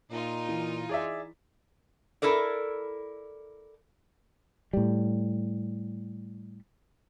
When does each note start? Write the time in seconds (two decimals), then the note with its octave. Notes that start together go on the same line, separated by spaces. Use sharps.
0.11 A#2 D#4 F4
0.49 E3
0.89 G#4 D5 E5
2.22 E4 A4 A#4 D5
4.73 A2 G3